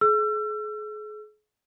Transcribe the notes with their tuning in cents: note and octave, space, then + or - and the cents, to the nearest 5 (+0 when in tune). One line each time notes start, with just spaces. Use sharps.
G#4 +40 E6 +35